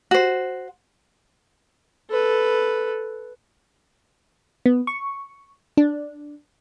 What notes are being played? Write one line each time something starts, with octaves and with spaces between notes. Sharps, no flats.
F#4 C5
A4 B4
B3
C#6
D4